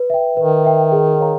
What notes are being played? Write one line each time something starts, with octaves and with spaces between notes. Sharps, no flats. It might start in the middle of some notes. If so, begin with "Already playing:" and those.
Already playing: B4
E5 G5
D#3 B4
E5 G5
G#4
C#5 F5 A#5